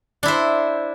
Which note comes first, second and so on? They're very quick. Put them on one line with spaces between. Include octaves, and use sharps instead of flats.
D4 E4 C5